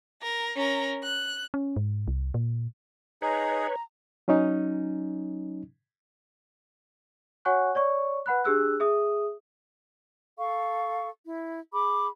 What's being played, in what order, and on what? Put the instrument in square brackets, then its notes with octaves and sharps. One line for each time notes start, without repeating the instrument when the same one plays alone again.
[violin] A#4
C#4 A#4
F#6
[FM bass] C#4
G#2
C2
A#2
[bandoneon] D#4 G#4 [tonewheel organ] B4 C#5 [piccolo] A#5
[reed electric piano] F#3 C#4 D#4
[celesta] F#4 C#5 F#5 G#5 C#6 F#6
C#5 D5 C#6
B4 F#5 B5 F#6
D4 G4 G#4 E6 F#6
G#4 E5 D#6
[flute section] A4 F5 C#6
E4
G#4 B5 D6